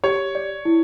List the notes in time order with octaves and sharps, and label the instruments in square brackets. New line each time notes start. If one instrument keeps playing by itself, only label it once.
[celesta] G4 [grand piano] C#5
[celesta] D5
E4